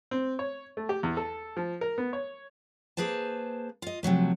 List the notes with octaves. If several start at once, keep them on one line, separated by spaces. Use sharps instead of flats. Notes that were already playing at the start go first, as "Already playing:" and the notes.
C4
C#5
A3
G4
E2
A4
F3
A#4
B3
C#5
A#3 G#4 B4 C5 A5
F4 D#5
C3 F3 F#3 A3